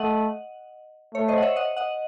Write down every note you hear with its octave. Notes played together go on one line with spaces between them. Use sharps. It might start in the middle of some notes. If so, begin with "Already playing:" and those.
Already playing: A3 D#5 F#5
A3 C#5
C5 D#5
F#5
C#5 E5
D#5 F#5
D#5 F#5